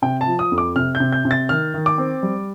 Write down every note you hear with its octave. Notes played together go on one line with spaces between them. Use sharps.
C3 G5
A5
F3
D#6
F2
D6
C3 F6
G6
C3
G6
C3
A6
D#3 F6
D#3
D6
C4
G3